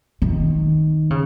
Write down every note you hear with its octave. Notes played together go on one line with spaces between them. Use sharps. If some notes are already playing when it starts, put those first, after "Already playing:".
D#3
C#3